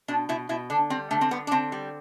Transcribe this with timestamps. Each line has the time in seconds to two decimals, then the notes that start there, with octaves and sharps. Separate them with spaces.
0.08 B2 D4
0.29 B2 E4
0.49 B2 E4
0.70 D3 D4
0.90 G3 C4
1.11 D3 A3
1.21 C4
1.31 D3 B3
1.47 D4
1.51 D3 C4
1.72 G3